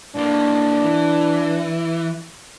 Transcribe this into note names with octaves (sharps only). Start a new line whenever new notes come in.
G2 A#3 D4
E3